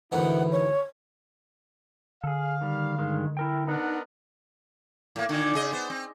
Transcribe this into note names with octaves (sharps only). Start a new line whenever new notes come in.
D2 G#2 D#3 E3 E4 B4 F#5
C#5
D3 G#4 A4 F5
D#3 G3
G2 D#3 G#3
E4 A#4 G5
B3 D4 D#4 A#4 D#5 F#5
A2 A#3
A#2 D3 D#3
C#3 G#4 D#5
B3 C5
C4